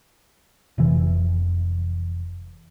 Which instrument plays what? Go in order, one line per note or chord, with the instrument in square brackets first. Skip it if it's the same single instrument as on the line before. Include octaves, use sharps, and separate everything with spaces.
[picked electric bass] F1 C3 E3